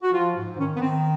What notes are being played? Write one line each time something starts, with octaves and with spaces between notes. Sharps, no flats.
F#4
F3 F4
G#2
D#3 C#4
B3
D#3 C4